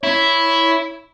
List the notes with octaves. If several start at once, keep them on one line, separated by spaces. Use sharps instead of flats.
E4 C#5